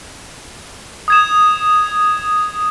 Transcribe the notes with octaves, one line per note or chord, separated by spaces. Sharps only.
D#6 G#6 E7